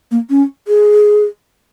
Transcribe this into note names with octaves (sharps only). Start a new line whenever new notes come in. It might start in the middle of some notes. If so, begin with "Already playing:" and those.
A#3
C#4
G#4